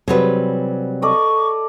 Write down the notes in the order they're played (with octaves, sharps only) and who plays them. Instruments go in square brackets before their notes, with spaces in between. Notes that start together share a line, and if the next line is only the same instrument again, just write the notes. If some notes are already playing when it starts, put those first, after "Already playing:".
[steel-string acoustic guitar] C3 F#3 G3 [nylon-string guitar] G#4 B4
[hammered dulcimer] A4 D5 D#5 [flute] C#6